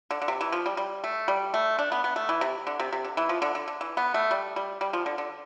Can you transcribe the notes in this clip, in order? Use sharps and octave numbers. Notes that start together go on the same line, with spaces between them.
D3
D3
C3
E3
F3
G3
G3
A3
G3
A3
D4
B3
B3
A3
E3
C3
D3
C3
C3
D3
E3
F3
D3
D3
D3
E3
B3
A3
G3
G3
G3
F3
D3
D3